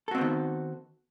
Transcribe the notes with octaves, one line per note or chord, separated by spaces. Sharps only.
D#3 B3 C4 F#4 A4